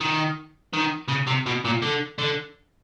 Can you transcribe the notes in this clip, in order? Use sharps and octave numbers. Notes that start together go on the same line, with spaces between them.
D#3
D#3
C#3
C3
B2
A#2
D3
D3